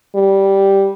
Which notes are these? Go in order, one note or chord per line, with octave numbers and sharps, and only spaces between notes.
G3